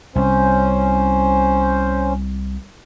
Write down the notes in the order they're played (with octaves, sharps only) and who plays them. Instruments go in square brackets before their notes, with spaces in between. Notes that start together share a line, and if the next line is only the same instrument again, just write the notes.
[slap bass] C2 [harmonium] C#4 C5